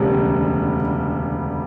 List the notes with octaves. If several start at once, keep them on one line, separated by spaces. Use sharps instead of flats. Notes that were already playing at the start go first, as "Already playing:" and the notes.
Already playing: E1 D2 C#3 G3